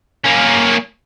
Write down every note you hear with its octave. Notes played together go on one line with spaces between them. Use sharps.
A#3 C#4